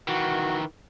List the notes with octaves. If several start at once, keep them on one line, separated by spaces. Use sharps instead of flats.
D#3 E3 F#4